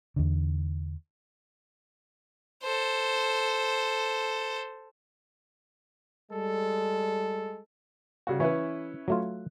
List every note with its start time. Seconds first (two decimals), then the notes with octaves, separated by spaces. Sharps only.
0.16 E2 D3
2.63 A4 C5
6.31 G3 G#3 A4
8.27 C#3 G3 F#4
8.40 E3 C#4 E4 B4
9.08 F#3 A3 F4